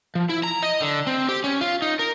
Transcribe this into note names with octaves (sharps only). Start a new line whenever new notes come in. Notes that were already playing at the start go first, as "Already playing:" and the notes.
F3
E4
A#5
D#5
D3
C4
G4
C#4
F4
D#4
A#4